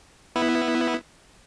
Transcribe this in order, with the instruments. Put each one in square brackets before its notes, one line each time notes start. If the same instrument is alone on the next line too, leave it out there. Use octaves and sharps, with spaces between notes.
[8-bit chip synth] B3 E4